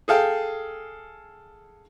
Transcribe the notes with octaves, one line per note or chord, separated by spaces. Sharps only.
G#4 A4 F5 G5